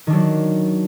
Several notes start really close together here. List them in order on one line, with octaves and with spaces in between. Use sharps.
D#3 D4 F#3